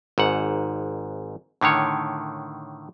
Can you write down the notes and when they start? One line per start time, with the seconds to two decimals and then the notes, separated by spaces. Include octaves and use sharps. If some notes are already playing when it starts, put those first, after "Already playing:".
0.18 G#1 G#2 F#5
1.61 A2 D3 D#3 C#5